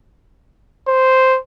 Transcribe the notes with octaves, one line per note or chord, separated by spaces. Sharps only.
C5